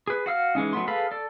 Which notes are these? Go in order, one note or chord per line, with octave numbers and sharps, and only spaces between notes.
G#4 B4
F#4 F5 E6 F6
E3 G#3 C#4 D#4
F#3 A3 B3 C6
G#4 A4 B4 F5 B5
A4 D5